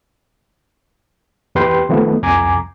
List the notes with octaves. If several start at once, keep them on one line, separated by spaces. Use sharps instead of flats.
E2 G4 B4 G5 C6
D#3 F3 A3 B3
C2 F2 G#5 A#5 D6